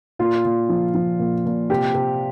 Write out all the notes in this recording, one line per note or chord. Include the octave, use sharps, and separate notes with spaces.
A#2 F4
A#2
F3
F3
A#2
A#2
C3 G4
C3